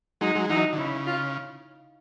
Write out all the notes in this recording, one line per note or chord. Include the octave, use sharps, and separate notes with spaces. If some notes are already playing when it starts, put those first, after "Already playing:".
F#3 G#3 D#4
F#3 G#3
E3 F#3 D#4
D3
C#3 E4
F4